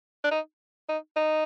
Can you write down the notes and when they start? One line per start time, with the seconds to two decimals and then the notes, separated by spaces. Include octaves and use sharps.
0.24 D4
0.31 D#4
0.89 D#4
1.16 D#4